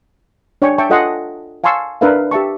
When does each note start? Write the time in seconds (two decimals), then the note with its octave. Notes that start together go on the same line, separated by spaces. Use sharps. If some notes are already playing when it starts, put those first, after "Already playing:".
0.62 D4 C#5 D5 G5 G#5 C#6
0.78 E5 G5 A5 C#6
0.90 F4 A4 D#5 F#5 G#5 C6
1.64 F5 G#5 A5 C6 C#6 E6
2.01 D4 A#4 B4 E5 F5
2.31 G4 E5 A5 C#6